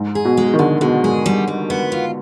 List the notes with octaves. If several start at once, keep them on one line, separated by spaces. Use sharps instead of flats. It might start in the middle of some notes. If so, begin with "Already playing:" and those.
Already playing: G#2
G#4
B2
G#3
D#3
D3 G#3
B2 G#3
G#2 G#4
G3
G3
B3
F4